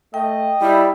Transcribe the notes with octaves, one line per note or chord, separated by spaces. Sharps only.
A3 D#5 G5
G3 E4